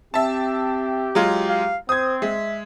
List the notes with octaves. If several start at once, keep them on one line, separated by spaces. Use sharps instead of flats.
C4 G4 E5 A5
F#3 G#3 F4
F5
C4 C5 D#6 G#6
G#3 E5